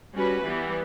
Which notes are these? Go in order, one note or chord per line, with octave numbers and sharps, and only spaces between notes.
G3 C#4 F#4 B4
E3 G3 B3